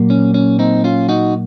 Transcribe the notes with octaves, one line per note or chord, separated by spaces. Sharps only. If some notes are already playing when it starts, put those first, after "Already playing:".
Already playing: A#2 F#3 A#3
C#4
C#4
C4 D#4
C#4 F4
D#4 F#4